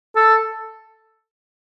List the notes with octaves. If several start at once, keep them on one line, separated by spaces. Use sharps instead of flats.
A4